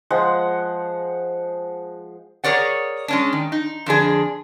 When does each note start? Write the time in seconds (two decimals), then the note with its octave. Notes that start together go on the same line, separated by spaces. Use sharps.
0.11 F3 G#3 F#5
2.44 G#4 A#4 C#5 D5 F#5
3.08 G#3 C#4 D4
3.33 D#3
3.52 D#4
3.86 F2 D3 D4 G#4